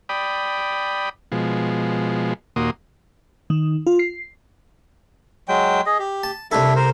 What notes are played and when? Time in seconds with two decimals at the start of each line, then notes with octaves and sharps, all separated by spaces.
0.09 D5 G5 B5 D#6
1.32 B2 F3 G#3
2.56 D#2 A#2 A#3 F#4 C6 D#6
3.50 D#3
3.87 F4
3.99 C7
5.48 F#3 G#3 G5
5.86 G#4 D#5
5.99 G4
6.23 A5
6.52 C2 D4 E4 A4 E5
6.76 A#4 C5